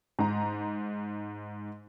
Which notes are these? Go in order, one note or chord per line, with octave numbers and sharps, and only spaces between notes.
G#2 A#5